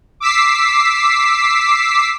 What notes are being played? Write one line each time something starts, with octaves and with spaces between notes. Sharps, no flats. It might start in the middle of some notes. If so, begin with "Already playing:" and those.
D6 E6 B6 C7